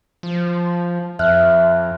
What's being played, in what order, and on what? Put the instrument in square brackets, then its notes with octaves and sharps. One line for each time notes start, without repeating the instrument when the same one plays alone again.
[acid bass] F3
[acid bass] F2 [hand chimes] E5 F6 F#6